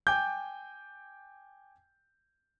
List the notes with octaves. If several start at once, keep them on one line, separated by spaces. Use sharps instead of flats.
G5 G#5 D6 G6